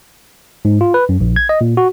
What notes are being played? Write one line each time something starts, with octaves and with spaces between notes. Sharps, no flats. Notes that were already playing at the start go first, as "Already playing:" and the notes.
G#2
F4
B4
F#2
A#1
G#6
D#5
A#2
F#4